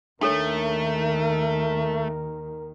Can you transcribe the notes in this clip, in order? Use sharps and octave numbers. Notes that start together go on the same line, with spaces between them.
D#2 D#3 A3 D4 A4 A#4 C#5